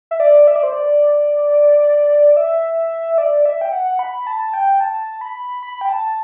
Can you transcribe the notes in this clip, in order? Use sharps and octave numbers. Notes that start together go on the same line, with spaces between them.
E5
D5
E5
D5
C5
D5
E5
D5
E5
G5
F#5
B5
A5
G5
A5
B5
B5
G5
A5